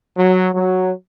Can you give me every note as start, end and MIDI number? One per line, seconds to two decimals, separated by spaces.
0.17 0.49 54
0.54 0.92 54